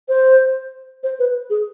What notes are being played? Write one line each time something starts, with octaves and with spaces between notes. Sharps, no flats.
C5
C5
B4
G#4